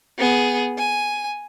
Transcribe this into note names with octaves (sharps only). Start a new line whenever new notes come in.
B3 G#4
G#5